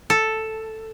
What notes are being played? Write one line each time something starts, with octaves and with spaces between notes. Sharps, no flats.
A4